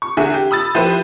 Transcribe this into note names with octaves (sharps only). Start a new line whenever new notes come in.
C#6
E2 D3 G#4 E5
G4
B5 D#6 E6 A6
F3 E4 G4 B4 C5 E7